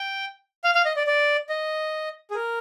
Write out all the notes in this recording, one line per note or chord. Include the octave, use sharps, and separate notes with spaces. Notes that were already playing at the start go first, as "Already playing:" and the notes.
Already playing: G5
F5
F5
D#5
D5
D5
D#5
G#4
A#4